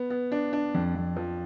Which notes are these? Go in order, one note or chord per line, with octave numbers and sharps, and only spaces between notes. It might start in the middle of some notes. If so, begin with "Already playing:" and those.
Already playing: B3
B3
D4
D4
F2
F2
F3